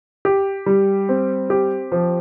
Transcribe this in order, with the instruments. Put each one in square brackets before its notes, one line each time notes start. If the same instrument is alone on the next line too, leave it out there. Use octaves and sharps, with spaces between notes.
[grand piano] G4
G3
C4
G4
F3